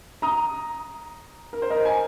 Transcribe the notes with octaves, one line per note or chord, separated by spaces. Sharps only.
A#5 D#6
A#4
C5
A#4 D#5
G#5